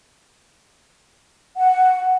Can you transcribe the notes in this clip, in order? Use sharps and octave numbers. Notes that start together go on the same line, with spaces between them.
F#5